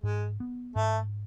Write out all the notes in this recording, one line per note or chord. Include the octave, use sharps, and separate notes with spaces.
G#2 G#3
B3
G#2 A3